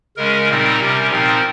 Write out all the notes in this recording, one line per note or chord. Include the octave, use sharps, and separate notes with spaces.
C#3 G#3 C#4 A#4
A#2 G3 C4 D#4
C3 G3 C#4
A#2 F3 C4 D#4 A#4